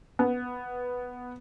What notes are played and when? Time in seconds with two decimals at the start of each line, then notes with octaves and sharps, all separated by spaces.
0.19 B3